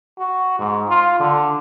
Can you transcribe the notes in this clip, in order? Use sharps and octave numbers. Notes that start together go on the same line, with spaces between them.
F#4
G#2
F4
D3